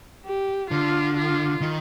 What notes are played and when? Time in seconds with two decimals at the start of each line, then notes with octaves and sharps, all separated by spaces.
0.26 G4
0.71 D3 F4
1.17 F4
1.61 D#3